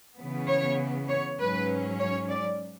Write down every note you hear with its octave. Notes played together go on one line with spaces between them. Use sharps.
C#3 E3 B3
C#5
C#5
G#2 F#3 C#4 B4
C#5
D5